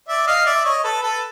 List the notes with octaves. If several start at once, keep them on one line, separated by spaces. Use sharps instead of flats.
D5 E5
D#5 F5
D5 E5
C#5 D#5
A4 B4
A4 B4